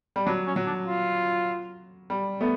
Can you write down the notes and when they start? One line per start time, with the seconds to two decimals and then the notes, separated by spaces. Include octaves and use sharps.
0.16 G3
0.26 F#3 D4
0.47 C#4
0.56 F#3
0.67 D4
0.87 F4
2.10 G3
2.41 A3 B3